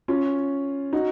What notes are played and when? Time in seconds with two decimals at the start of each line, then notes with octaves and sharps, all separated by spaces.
0.08 C#4 F4
0.93 D#4 F#4